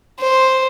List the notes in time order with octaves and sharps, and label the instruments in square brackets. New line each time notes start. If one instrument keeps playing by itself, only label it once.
[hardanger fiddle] C5